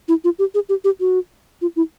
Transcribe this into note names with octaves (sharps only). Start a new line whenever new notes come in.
E4
F4
G4
G#4
G4
G4
F#4
F4
E4